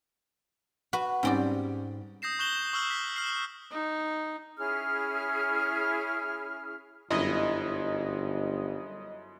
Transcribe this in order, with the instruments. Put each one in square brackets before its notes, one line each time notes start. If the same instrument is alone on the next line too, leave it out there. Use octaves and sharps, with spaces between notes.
[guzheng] F#4 B4
[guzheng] G#2 C4 D5 [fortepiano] G3 C#4
[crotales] D#6 G6 A#6 C7 E7
C#6 F#6 G6 E7 F#7 G7
C#6 E6 F6 F#7 G7
B6
F6 C7
[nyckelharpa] D#4
[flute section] C#4 E4 G#4 F6
[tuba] G1 [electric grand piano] F#2 E4 [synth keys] D#5